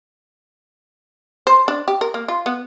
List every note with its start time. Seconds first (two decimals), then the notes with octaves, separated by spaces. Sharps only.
1.47 C5
1.68 D4
1.88 G4
2.01 A#4
2.14 A#3
2.28 F4
2.46 B3